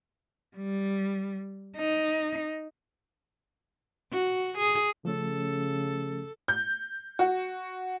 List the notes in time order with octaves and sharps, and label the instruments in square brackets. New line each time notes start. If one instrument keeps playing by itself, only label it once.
[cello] G3
D#4
[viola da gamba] F#4
G#4
[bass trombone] C#3 [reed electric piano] F3 A3 C#4 [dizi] A4
[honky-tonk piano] G6
F#4